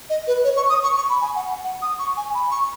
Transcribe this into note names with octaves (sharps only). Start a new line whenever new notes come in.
D#5
B4
C#5
C#6
D#6
C#6
C#6
B5
G#5
F#5
F#5
F#5
D#6
C#6
G#5
B5
C#6